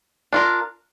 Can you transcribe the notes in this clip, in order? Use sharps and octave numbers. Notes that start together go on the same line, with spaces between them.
D4 F4 A#4